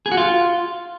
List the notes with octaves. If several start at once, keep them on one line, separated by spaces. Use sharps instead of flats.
G#4
F#4
F4